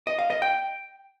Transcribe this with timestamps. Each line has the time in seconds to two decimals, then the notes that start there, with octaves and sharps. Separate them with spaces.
0.07 D#5
0.19 F5
0.30 D#5
0.42 G5